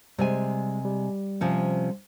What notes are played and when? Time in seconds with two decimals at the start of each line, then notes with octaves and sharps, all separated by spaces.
0.18 C3 G3 G#3 G#5
0.85 G3
1.41 C3 F3 C#4